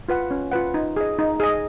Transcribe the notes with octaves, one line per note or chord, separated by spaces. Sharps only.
F4 B4 F#5
C#4
F4 B4 F#5
D#4
G#4 D#5
D#4
G#4 D#5